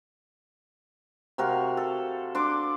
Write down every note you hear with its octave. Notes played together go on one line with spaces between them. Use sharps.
C3 F#4 A#4 F5
A4
D4 C6 D6